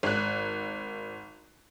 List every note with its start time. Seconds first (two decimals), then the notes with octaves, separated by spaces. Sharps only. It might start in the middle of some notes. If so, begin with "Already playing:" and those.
0.03 G#1 F#6